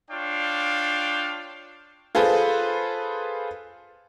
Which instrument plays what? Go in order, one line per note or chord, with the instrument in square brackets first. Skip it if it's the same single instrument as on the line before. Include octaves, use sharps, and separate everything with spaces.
[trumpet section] D4 F4 C#5 F5 G5
[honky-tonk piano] F4 G#4 A4 B4 C5